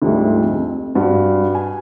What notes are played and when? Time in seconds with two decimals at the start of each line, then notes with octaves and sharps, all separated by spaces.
0.02 D2 G#2 F3 G3 A3
0.42 F2
0.95 G2 F#4 F#5
1.55 G#5